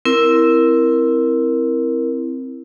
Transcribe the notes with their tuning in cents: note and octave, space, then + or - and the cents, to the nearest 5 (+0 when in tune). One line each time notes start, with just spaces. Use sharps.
C4 +0 E4 +0 A#4 +5